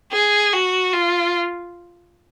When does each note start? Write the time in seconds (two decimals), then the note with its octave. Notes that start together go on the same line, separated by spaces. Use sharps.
0.13 G#4
0.53 F#4
0.94 F4